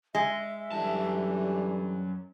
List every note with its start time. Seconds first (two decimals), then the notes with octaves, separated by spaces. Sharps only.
0.15 G#3 E5
0.72 F#2 D3 E3 G3 A5